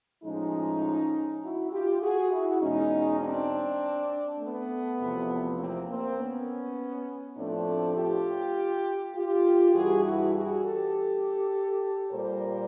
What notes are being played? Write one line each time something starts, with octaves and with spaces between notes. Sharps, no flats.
A2 F3 G#3 C#4 D#4
E4 F#4
F4 G4
F#4 G#4
E4 F#4
E2 B2 G#3 C#4 D#4
C4 D4
A3 B3
E2 C3 F3
A#3 C4
A#3 C4
B3 C#4
A2 F3 A3 C4 D4
F4 G4
F4 G4
G2 E3 G3 F#4 G#4
E4 F#4
F#4 G#4
G4 A4
A#2 G3 A#4 C5